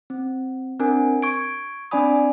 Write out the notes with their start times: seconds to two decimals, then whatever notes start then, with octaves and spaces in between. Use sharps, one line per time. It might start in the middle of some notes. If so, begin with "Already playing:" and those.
0.10 C4
0.80 C4 D4 A#4 G#5
1.23 C#6 G#6 D7
1.91 C4 D4 D5 G#5 B5 D#6